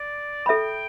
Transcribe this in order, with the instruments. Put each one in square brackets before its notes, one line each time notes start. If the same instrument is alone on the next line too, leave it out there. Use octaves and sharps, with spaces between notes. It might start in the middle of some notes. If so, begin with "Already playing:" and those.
Already playing: [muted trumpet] D5
[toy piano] A4 E5 B5 [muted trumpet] G5